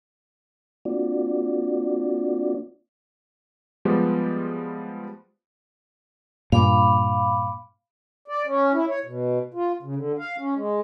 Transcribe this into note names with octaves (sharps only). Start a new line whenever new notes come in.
A#3 C4 D4 F4 F#4 D5
F3 G3 G#3 B3 G4
G2 A#2 F5 B5 D6
D5
C#4
E4
C#5
B2
F4
C#3
D3
F5
C#4
G#3